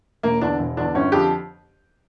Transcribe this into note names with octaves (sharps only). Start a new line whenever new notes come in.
E1 A#3
E2 D3 D4
E1
E2 D3 D4
G1 C#4
F2 D3 F3 G4